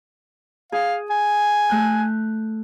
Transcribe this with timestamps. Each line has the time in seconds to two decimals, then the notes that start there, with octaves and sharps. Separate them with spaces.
0.72 G#4 F5
1.10 G#5
1.70 A3 F#6 G6